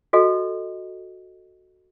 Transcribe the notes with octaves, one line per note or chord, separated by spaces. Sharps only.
F#4 A4 D#5